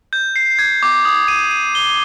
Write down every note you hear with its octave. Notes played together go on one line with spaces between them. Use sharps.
G6
C7
G#6
D6
D#6
D#7
D#7
G7